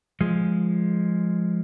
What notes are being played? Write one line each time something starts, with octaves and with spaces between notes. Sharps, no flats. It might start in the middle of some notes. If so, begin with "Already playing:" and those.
F3 G#3